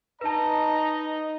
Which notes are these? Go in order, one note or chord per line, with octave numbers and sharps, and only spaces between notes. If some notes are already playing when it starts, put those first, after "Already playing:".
D#4 B4 D#5 A5 A#5